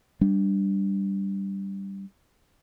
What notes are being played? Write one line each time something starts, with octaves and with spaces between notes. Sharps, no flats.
G3 D4